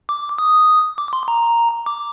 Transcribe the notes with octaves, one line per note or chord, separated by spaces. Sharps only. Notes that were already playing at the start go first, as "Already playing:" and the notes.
D6
D#6
D6
C6
A#5
D6